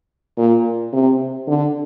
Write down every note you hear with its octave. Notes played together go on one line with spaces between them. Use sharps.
A#2
C3
D3